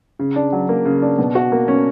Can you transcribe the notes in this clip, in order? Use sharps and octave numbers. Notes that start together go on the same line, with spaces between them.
C#3
D4
F#3
A#3
C#3
D4
B2
F#4
A#3
C#4